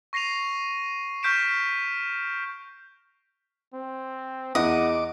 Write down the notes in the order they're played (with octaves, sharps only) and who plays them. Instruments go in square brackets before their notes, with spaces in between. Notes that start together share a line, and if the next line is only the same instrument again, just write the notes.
[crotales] C#6 A#6 C7 D#7 F7
C#6 F6 G6 B6 D7 E7
[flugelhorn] C4
[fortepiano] E2 [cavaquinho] D#5 [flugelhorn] F#5 [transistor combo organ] D6